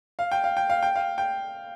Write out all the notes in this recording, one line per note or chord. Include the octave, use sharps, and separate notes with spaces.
F5
G5
F5
G5
F5
G5
F5
G5